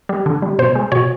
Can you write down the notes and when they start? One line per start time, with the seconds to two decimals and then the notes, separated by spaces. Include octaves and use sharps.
0.09 G3
0.26 D3
0.42 G3
0.59 B2 C5
0.75 G#3
0.92 B2 C#5